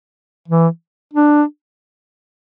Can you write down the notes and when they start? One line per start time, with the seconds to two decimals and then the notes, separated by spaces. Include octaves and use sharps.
0.48 E3
1.13 D4